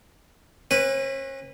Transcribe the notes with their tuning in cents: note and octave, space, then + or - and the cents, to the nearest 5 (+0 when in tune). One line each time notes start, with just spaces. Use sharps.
C#4 -40 B4 +0